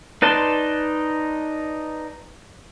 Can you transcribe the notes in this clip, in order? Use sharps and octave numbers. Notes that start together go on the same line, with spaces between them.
D#4 B4 D5 A5 C6